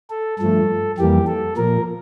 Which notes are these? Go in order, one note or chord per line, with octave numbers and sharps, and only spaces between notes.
A4
G2 F3 A3 A4
F2 E3 G3 A#3 G4
A4
A#2 F3 A#3 A#4